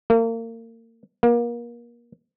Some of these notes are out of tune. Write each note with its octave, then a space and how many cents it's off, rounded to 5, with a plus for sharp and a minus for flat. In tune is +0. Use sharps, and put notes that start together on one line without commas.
A#3 -35
A#3 +30